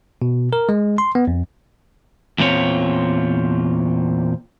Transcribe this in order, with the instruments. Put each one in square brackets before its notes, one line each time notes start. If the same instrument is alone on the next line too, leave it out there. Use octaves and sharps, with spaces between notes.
[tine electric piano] B2
A#4
G#3
C6
B3
F2
[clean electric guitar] E2 A#2 C4 F4 C#5